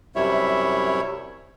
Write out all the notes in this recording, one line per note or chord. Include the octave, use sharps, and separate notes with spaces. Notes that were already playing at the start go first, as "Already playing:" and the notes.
F#2 C3 G3 E4 C#5 E5